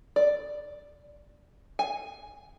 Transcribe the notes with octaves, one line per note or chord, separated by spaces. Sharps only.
D5
G#5